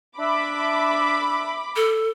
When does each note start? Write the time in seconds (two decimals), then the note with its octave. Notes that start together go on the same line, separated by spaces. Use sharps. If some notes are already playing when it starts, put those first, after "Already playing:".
0.18 D4 E5 B5 D6
1.76 A4